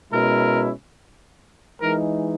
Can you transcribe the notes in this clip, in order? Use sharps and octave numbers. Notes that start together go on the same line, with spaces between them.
B2 G#3 C#4 E4 A#4
E3 G#3 D#4 A#4